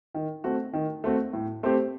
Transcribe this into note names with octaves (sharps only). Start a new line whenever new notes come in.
D#3
A3 C4 F#4
D#3
A3 C4 F#4
A2
A3 C4 G4 C5